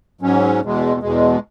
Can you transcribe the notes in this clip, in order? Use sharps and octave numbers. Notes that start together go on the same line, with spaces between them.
G#2 F#3 C#4
E2 B2 G#3
E2 B2 G#3